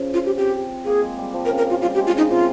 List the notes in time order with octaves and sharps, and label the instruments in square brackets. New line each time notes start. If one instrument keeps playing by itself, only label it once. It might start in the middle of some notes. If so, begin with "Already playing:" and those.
Already playing: [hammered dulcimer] C#3 F3 C#4
[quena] F4
G4
[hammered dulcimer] C4 [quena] G4
[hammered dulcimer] A#3 [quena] G#4
[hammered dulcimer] G#3
G3
F3
[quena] A#4
[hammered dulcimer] C#3
[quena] A#4
F4
[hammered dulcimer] G3 [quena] F4
[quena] G4
[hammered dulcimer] G#3
[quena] F4
[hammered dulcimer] C#3 [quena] D#4
[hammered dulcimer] C3 [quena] F4